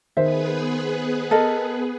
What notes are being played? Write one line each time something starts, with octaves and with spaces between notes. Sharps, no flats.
D#3 B3 G#4 B4 C5 E5
A4 A#4 D#5